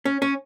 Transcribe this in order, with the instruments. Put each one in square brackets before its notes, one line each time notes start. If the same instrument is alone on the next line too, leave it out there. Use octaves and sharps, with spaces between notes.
[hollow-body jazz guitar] C#4
C#4